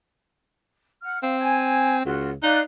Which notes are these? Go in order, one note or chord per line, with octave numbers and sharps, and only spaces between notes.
F#5 F6
C4 F5
G#5 G#6
C#2 F4 F#4
D#4 D5 F5 F#6